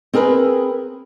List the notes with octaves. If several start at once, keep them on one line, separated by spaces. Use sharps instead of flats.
C4 G#4 A#4 B4